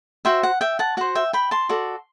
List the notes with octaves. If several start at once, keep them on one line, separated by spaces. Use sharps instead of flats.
F#4 C5 E5 G5
F#5
E5 G5
F#5 A5
F#4 C5 F#5
E5 G5
G5 B5
A5 C6
F#4 A4 D5